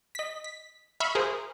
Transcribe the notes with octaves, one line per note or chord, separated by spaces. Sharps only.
D#5 B6
B6
E5 F5 B5 C#6
G#4 A#4 C5